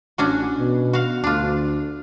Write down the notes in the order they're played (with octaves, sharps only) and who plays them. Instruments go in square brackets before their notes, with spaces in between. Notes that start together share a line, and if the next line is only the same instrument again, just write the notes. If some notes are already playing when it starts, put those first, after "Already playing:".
[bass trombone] A1 [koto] C#4 D4 F#4
[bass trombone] B2
[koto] F#4 F5
[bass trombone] D2 [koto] D4 F4